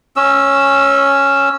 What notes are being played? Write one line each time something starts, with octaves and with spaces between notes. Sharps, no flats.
C#4 E6